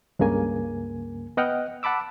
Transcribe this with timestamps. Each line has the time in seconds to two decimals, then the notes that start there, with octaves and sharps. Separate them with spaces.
0.19 C#2 G2 C#3 A#3 G#5
1.37 B3 D#5 F#5 G5 F6
1.83 F#5 A5 B5 D6 E6